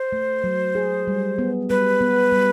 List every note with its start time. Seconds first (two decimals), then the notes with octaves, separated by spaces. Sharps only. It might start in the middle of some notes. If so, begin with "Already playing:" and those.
Already playing: C5
0.12 A3
0.44 F#3
0.75 G#4
1.08 G3
1.38 B3
1.70 G3 B4
2.01 B3
2.32 G3